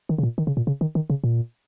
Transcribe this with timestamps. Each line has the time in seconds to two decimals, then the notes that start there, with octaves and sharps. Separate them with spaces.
0.09 D#3
0.18 C#3
0.23 A#2
0.38 D#3
0.47 C#3
0.57 A#2
0.67 C#3
0.81 D#3
0.95 D#3
1.10 C#3
1.24 A#2